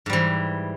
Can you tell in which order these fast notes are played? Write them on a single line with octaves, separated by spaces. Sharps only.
G#2 G3 E3